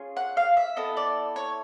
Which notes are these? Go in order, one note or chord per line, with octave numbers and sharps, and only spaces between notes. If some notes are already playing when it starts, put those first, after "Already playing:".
Already playing: C#4 F4 G#4
F#5
F5
E5
B3 E4 A4 D#5
D5
C#5